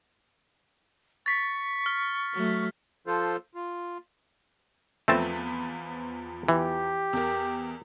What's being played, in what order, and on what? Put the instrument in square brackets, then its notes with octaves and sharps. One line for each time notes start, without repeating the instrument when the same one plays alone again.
[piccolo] C#6 [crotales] A6 B6
[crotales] F6
[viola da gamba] F#3 A3
[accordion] F3 F4 A4 C5
F4
[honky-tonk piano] E2 F3 B4 [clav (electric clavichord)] A3 C4 A5
[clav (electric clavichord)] E3 [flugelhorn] G4
[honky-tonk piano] E2 A#4